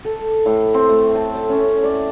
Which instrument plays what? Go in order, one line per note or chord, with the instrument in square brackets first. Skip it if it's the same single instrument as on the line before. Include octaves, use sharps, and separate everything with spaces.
[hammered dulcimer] A4
A2
C4
A3
A5
A5
C#4
D5